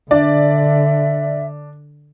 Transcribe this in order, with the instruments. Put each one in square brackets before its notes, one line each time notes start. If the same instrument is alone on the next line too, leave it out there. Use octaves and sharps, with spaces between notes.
[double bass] D3 [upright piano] D4 [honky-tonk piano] D5 [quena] E5